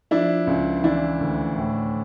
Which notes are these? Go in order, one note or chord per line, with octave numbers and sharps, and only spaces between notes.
F3 D4 E4
C#2
E3 D4 E4
D2
A2